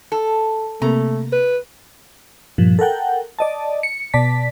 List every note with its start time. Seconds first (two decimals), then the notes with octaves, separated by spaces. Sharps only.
0.12 A4
0.82 C3 A3 A#3 A#5
1.32 B4
2.58 G2 A#2 F3
2.79 A4 A#4 F#5 G5
3.39 D5 D#5 A5
3.83 C#7
4.14 B2 D5 A5 B6